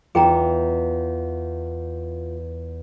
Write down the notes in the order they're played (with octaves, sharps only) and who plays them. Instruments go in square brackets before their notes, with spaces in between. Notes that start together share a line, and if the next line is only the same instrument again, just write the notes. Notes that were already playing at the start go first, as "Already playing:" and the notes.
[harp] E2 [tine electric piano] F4 [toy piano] G#4 G5 A#5